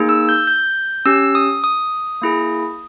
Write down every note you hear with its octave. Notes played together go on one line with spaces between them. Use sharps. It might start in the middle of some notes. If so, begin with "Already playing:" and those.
Already playing: A#3 D#4 G#4
E6
G6
G6
C#4 G4 E6
D#6
D#6
A#3 E4 G#4